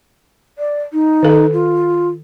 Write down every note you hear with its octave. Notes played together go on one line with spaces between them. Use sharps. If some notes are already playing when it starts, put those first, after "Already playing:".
D5
D#4
D#3 A4
F4